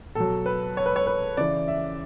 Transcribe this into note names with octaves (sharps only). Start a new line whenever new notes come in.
B2 F#3 A4
B4
C#5
B4
C#5
B4
C#3 E3 D5
E5